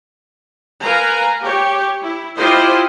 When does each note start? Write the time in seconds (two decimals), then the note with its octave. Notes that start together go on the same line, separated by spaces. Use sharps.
0.83 A#4 B4 F5 G#5 A#5
1.42 G4 C#5
2.02 E4
2.37 E4 F4 G4 C5 D#5